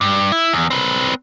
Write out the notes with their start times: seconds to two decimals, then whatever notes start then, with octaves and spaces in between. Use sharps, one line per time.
0.01 G2
0.32 E4
0.53 E2
0.70 C4 B4